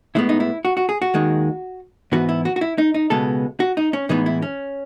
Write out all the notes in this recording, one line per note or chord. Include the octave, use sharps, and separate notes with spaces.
A2 G#3 B3 E4
D#4
E4
F#4
F#4
G#4
F#4
D#2 D#3 G#3
G#2 E3 B3 F#4
E4
F#4
F#4
E4
D#4
D#4
C#2 B2 G#3 B3 A4
F#4
D#4
C#4
A2 E3 G#3 B3 D#4
E4
C#4